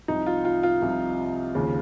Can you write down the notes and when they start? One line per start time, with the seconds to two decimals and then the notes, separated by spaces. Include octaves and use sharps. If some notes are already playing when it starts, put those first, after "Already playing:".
0.08 C2 C3 F3 D#4
0.26 F4
0.45 F4
0.63 F4
0.82 C2 C3 F3
1.55 D#2 C#3 F3